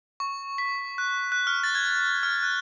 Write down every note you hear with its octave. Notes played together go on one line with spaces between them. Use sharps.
C#6
B6
F#6
F#6
F6
A6
G#6
F6
F#6